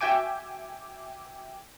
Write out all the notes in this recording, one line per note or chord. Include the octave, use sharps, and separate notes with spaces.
F#4 E5 G5 G#5 D6